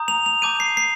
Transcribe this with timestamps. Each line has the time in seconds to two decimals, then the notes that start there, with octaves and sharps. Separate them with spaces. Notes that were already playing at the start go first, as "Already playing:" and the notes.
Already playing: A#5 D#6 G6
0.08 F7
0.26 F7
0.42 A5 D6 G6 D#7
0.60 C7
0.77 C7